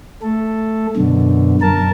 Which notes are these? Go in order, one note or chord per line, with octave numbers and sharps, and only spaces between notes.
A3 A4
F#2 B2 D3
F#2 A#4 A5